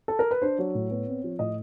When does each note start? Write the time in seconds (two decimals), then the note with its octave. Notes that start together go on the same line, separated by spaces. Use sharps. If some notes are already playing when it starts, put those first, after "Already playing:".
0.08 A4
0.19 A#4
0.31 B4
0.42 D4 C5
0.58 F#3 C#5
0.75 A2
0.91 B3
1.07 C4
1.24 F3
1.39 A2 D#5